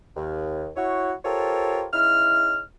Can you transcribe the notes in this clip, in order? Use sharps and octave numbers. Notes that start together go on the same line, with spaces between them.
D#2
E4 F#4 C#5
F4 G4 A4 A#4 C5 C#5
C#3 D#4 E4 F6